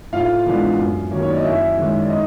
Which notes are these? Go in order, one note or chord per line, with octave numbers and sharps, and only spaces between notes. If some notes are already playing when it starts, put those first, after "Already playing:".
A2 F4 F5
E3 G#3 B3 D4
F#2
D#3 F#3 A#3 C#4
C#5
D5
D#5
F#2 E4 E5
D#3 G#3 C#4
D5
D#4 D#5